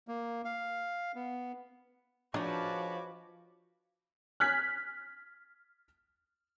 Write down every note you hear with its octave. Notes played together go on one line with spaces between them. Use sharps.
A#3
F5
B3
F3 G#3 D4 D#4 F#4 B4 C#5 D6
F6 F#6 G#6 B6